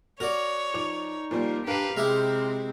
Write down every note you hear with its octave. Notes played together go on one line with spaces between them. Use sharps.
F#4 A#4 C#5 D5 F7
F3 D#4 D6 F7
A#2 F3 G3 A#3
D4 G4 A#4 B4 F5 C7
C3 G#3 C4 E4 G4 F6